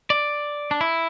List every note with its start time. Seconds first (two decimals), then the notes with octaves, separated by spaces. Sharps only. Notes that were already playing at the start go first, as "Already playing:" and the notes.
0.10 D5
0.71 D4
0.81 E4